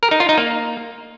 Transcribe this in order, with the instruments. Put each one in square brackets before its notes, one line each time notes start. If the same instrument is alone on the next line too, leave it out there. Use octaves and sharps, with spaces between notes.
[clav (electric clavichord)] A#4
D#4
F4
D#4
A#3